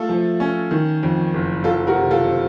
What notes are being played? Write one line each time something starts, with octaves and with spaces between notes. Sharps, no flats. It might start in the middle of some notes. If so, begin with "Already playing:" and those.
Already playing: A3 F4 A4
F3
C#4
D#3
F2
F#1
F#3 F4 A4
F#4 A#4
C3
F4 A4
C4